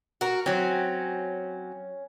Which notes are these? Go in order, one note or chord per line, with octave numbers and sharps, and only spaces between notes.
F#4 A#4
F#3 C4 C#4